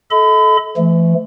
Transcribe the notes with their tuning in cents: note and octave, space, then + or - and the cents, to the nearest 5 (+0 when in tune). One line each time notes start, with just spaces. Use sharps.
A4 -25 D#5 +40 B5 +35
E3 +40 A3 -5